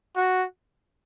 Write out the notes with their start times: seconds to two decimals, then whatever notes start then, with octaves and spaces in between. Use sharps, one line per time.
0.16 F#4